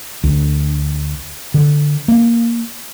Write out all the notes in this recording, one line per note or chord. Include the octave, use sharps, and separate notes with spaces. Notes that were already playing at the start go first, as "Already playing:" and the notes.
D2
D3
A#3